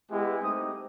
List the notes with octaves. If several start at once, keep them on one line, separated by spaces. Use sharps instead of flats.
G#3 B3 E4 G4
A3 C4 D#4 G4 D#6